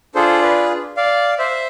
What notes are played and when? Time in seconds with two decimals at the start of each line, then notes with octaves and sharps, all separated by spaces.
0.15 D4 F4 G#4 A4 C5
0.42 B4 D5
0.97 D5 F5
1.39 C5 E5